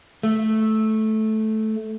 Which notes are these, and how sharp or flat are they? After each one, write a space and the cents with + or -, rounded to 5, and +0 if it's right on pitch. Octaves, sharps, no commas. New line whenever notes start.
A3 -10